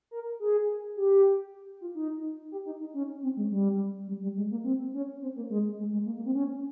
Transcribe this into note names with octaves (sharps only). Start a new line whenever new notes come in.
A#4
G#4
G4
F4
D#4
G4
D#4
D#4
C#4
C4
G#3
G3
G3
G3
G#3
A#3
C4
C#4
C4
A#3
G#3
G#3
G#3
A#3
A#3
C4
C#4